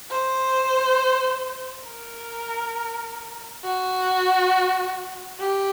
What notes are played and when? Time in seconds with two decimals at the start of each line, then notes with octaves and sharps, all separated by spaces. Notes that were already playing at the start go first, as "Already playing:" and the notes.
0.11 C5
1.87 A#4
3.64 F#4
5.39 G4